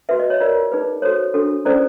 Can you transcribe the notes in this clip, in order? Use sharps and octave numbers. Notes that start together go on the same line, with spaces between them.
F#4 B4 E5
D#5
C#5
F4 A#4 C#5 D5
D#4 G#4 B4
F#4 A4 C5 C#5
D4 F#4 A4
C#4 E4 A4 C5 D5